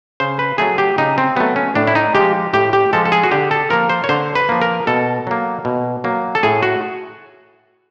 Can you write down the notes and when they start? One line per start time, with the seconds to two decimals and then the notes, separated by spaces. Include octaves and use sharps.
0.20 C#3 C5
0.39 B4
0.58 F#3 A3 G#4
0.78 G4
0.98 C#3 D#4
1.18 C4
1.37 F#3 A3 B3
1.56 C#4
1.75 A2 D4
1.87 E4
1.95 D#4
2.15 F3 G#3 G4
2.53 A2 G4
2.73 G4
2.93 F3 G#3 A4
3.05 A4
3.12 G#4
3.23 F#4
3.31 D3 G4
3.51 A4
3.70 F3 A#3 A#4
3.90 C5
4.04 C#5
4.09 D3 C5
4.35 B4
4.49 F3 A#3
4.62 A#4
4.87 B2 A4
5.27 F#3 A#3
5.65 B2
6.04 F#3 A#3
6.35 A4
6.43 A2 G#4
6.63 F#4